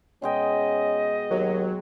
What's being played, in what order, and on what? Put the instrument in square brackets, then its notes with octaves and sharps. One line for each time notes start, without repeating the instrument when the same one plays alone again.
[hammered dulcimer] B2 G#3 G5 [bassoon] C#4 [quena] D#5
[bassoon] D#2 [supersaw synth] F#3